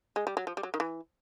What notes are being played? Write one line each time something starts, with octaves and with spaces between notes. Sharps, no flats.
G#3
G3
F#3
F3
G3
F#3
D#3
E3